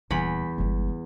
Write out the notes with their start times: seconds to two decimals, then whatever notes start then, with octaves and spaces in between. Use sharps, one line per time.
0.11 D#1 E2 B5
0.58 G1 G#3